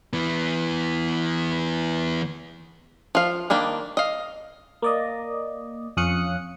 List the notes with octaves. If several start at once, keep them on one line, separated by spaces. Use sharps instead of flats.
E3 B3
F3 F5
D#3 A#3 D4 B5
D#5 F5
A#3 D5 D#5
F2 C#4 F5 D#6 F#6 C#7